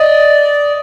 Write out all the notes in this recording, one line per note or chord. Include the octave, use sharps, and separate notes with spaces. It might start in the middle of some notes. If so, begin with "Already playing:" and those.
Already playing: D5 D#5